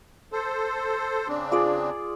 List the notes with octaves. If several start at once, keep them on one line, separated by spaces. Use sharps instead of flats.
A4 C5
C#3 C4 D4
F4 G#4 D5